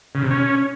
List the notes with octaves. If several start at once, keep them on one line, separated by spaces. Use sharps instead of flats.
C#3
C3
C#4